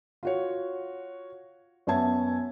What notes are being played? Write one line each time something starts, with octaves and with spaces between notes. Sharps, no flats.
F4 F#4 C#5
F#2 B3 C#5 E5 A5 G#6